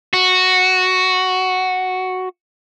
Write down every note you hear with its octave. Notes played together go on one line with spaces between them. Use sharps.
F#4